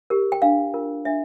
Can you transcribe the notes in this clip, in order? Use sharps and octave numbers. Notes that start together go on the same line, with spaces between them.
G4 A#4
G5
D4 F5
F4 A#4
D4 E5